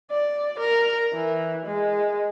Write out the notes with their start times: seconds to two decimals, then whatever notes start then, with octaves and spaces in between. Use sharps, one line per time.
0.10 D5
0.60 A#4
1.14 E3
1.66 G#3